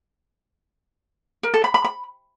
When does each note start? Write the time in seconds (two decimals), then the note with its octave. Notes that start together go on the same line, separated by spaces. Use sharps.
1.43 A#4
1.54 A4
1.64 B5
1.74 B5
1.84 B5